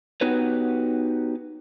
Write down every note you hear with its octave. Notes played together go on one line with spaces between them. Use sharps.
B3 D#4 F#4 G4 B4 C#5